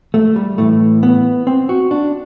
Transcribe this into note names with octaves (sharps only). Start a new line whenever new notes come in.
A3
G3
A2 E3 A3
B3
C4
F#4
D4